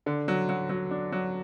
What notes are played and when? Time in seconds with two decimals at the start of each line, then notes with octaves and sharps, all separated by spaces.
0.06 D3
0.28 F#3
0.49 F#3
0.69 F#3
0.91 D4
1.12 F#3